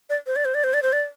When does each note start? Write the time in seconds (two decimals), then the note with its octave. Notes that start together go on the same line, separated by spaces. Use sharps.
0.10 D5
0.27 C5
0.36 D5
0.45 C5
0.54 D5
0.64 C5
0.74 D5
0.83 C5
0.93 D5